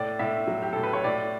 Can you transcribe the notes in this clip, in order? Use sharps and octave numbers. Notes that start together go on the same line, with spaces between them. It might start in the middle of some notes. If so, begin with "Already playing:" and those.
Already playing: A2 D5
A2 E5
F#3
G4
A2 A4
B4
C#5
A2 D5